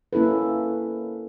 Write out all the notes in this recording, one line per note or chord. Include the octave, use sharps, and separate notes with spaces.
A#3 C#4 E4 A4 B4